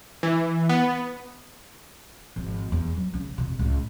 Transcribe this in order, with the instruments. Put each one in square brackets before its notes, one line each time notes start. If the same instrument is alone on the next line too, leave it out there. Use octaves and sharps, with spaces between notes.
[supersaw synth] E3
B3
[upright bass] G#1 F3
E2
F#3
C#3 C#4
F2 C3
C#2 A2